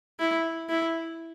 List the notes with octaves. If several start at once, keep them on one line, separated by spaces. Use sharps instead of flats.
E4
E4